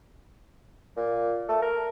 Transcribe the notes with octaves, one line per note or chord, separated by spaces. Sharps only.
A#2
A3
A#4